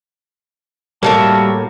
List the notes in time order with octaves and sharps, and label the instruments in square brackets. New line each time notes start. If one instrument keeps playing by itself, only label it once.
[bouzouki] A2 C#3 A#3 [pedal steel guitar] G3 F#4 E5 [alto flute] A5